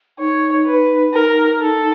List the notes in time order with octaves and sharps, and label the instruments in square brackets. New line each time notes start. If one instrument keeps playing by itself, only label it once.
[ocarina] D#4 [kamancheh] C#5
[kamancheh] B4
[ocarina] D#4 [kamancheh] A#4
[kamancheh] A4